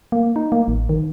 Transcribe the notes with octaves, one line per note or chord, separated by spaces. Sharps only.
A#3
D#4
A#3
A1
D#3